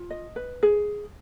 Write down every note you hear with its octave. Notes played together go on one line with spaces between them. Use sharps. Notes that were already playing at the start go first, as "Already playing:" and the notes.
Already playing: F4
D#5
B4
G#4